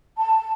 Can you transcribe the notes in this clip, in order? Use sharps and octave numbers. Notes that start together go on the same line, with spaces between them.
A5